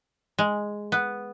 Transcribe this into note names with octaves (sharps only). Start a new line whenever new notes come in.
G#3
B3